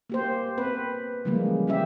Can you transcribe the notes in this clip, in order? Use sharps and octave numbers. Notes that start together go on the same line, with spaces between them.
A#3 G4 C5
C4 B4
C#3 E3 F3 G3 G#3 A#3
C#3 E3 C#4 G4 E5